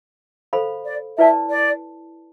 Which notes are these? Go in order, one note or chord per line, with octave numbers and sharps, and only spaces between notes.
A4 C5 F5 B5
D5
E4 B4 D5 E5 A5
D5